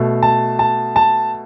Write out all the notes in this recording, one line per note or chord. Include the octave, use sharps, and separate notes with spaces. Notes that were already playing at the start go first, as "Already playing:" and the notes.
Already playing: B2 A3
A5
A5
A5